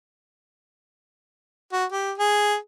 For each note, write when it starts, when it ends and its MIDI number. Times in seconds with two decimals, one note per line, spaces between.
1.73 1.85 66
1.92 2.12 67
2.18 2.55 68